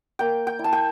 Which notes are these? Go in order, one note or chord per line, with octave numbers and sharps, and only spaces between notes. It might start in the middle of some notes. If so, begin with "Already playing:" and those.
A#3 G5
G5
E4
A5
G5